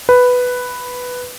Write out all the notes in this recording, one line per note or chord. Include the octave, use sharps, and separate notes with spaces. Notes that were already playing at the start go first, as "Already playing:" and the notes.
B4